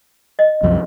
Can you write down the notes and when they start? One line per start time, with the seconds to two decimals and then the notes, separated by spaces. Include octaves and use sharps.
0.39 D#5
0.63 C2 F#2 F3